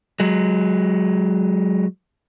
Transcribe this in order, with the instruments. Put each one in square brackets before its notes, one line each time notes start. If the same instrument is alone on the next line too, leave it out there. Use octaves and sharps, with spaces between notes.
[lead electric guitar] F#3 G#3